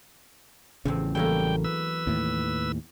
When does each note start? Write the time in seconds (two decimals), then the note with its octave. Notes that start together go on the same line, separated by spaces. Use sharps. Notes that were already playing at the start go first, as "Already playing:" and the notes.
0.85 A1 E2 C#3 F3 C4
1.15 E3 F#3 G3 A3 A#3 E4 A#4 G5
1.64 B4 E6
2.07 D#2 A2